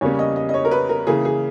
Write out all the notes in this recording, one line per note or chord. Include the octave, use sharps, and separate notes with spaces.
E2 C#3 G3 A#3 C#4 C#5
D#5
D#5
D#5
C#5
A#4
B4
A#4
C#3 E3 A#3 G#4
G#4